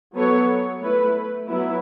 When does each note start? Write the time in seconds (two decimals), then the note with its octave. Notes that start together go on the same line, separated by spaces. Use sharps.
0.15 F#3 B3 A4 C#5
0.81 A3 E4 B4
1.48 F#3 B3 E4